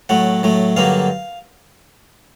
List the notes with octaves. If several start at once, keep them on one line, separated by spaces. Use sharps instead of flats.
A2 F#3 A3 F#5
A2 F#3 A3
G2 D3 F#3 A#3 F5